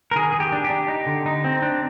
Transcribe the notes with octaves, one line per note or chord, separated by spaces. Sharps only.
A#4
D#3 G#4
D#3 G#4
G4
D4
G4
D4
D#4
D3
D#4
C4
D4